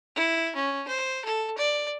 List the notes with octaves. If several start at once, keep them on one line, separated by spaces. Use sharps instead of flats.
E4
C#4
C5
A4
D5